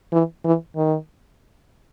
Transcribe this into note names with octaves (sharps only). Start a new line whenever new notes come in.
E3
E3
D#3